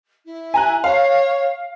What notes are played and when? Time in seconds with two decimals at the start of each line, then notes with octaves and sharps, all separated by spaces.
0.25 E4
0.54 G#5 A#5 F#6
0.84 C#5 F5